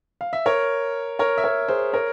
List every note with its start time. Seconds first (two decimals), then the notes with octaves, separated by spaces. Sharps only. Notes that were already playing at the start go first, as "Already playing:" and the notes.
0.21 F5
0.33 E5
0.46 A#4 C#5
1.19 A#4 C#5
1.38 E5
1.44 A#4 C#5
1.68 G#4 C5
1.93 A#4 C#5